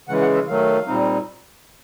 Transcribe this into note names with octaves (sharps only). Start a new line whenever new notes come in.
C#3 E3 G#3 F#5
F#5
E5
D#3 F#3 A3 F5
A#2 G3 C4 D#4